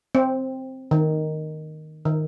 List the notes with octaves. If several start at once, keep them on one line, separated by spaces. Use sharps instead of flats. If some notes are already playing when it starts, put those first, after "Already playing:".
C4
D#3
D#3